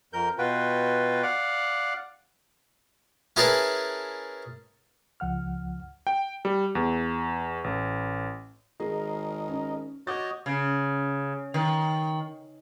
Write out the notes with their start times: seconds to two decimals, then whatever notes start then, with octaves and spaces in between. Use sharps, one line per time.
0.13 F2 A#4 G6
0.38 B2 F4 F#4 B4 G5
1.23 D5 F5 F#5 F#6
3.36 C#4 E4 G#4 A#4 B4 A5
5.20 C#2 F3 F#5 F6
6.07 G5
6.45 G3
6.75 E2
7.64 A1
8.80 G#1 G#4 A#4 D#5
9.48 C#4
10.07 F#4 C#5 D#5 D6 G6 A6
10.46 C#3
11.54 D#3